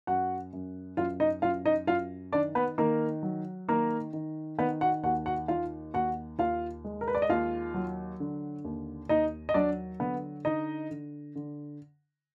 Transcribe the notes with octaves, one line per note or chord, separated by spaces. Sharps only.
F#2 F#4 F#5
F#2
F#2 F4 F5
D#4 D#5
F#2 F4 F5
D#4 D#5
F#2 F4 F5
D#3 D4 D5
B3 B4
D#3 A#3 A#4
F#3
D#3 A#3 A#4
D#3
D#3 B3 B4
F#4 F#5
D#2 F#4 F#5
F#4 F#5
D#3 F4 F5
D#2 F#4 F#5
D#2 F4 F5
G#3
A#4
B4
D5
D#5
D#2 F4 F5
F#3
D3
D#2
D#2 D#4 D#5
D#5
F#3 D4 D5
D3 B3 B4
D3 D#4 D#5
D3
D3